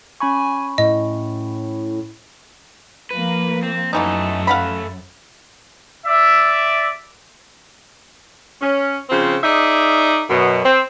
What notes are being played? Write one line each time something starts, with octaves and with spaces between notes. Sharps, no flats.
C#4 G#5 B5 C#6
A2 D#5
F3 A#3 B4
C4
F#2 B2 E3 A3 C#4 D#4 A4
F5 F#5 B5
D5 E5
C#4
C#3 F3 C4
D#4 G#4 D5 E5
F#2 B2
C4